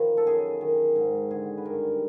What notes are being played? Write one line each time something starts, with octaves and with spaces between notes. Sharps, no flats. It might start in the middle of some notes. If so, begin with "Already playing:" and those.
Already playing: D#3 F3 B4
A4
F#2 G#4
D#3
G#2
D3 G#4
B4
G2 A#4